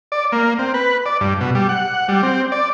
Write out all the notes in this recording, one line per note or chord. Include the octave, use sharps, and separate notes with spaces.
D5
A#3
C4
B4
D5
G2
B2
G3
F#5
G3
C4
D5